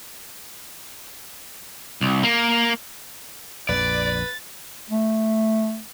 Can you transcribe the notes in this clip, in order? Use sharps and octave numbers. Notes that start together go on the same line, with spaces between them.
C2
A#3
A#1 F2 B4 D5 A6
A3